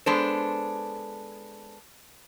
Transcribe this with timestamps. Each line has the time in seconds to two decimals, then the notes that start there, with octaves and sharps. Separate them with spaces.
0.06 G#3 B3 D4 A4 C5